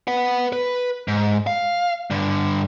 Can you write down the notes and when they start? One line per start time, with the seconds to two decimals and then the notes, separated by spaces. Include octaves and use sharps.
0.08 B4 F#5
0.53 B4
1.08 G#2
1.47 F5
2.10 G2 D3